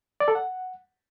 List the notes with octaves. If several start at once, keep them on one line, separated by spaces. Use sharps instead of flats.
D5
A4
F#5